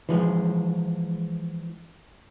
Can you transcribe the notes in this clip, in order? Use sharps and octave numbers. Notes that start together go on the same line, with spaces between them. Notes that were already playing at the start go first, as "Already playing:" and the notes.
E3 F3 G#3